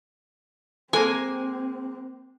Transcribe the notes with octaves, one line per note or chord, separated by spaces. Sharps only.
G#3 A#3 C4 A4 C5 G#5